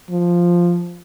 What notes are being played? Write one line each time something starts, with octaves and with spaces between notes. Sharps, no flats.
F3